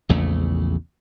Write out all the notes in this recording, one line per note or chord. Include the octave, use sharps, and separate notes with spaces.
A#1 E2 C#3 A3